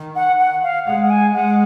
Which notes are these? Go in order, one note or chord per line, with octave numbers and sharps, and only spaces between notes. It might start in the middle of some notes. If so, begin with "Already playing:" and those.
Already playing: D#3
F#5
F#5
F5
G#3 F#5
F#5
G#5
G#3 F#5